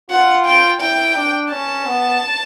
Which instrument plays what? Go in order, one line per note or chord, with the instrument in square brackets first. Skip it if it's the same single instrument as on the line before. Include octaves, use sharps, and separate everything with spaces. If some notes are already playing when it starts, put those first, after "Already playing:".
[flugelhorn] F4 [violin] F#5
[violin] G5
[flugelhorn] E4 [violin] G5
[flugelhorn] D4
[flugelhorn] C#4 [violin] A5
[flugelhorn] B3